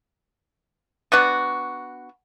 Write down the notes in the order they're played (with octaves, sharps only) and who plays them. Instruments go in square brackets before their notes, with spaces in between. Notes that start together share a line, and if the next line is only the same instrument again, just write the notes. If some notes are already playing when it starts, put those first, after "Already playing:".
[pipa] B3 D4 F#4